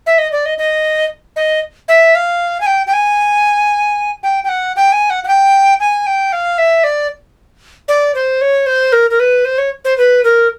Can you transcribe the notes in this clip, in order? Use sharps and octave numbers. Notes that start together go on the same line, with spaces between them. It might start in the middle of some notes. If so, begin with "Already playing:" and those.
E5
D#5
D5
D#5
D#5
D#5
E5
F5
G#5
G5
G5
G#5
G5
G5
F#5
G5
G#5
F#5
F#5
G5
G#5
G5
F5
E5
D5
D5
C5
C#5
C5
A#4
A#4
B4
C5
C#5
C5
B4
A#4